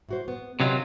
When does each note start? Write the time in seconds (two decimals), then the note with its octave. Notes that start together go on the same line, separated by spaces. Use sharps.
0.09 A2 F#4 C5
0.28 B3
0.60 C3 D#3 F#3 C#4 F4 D#5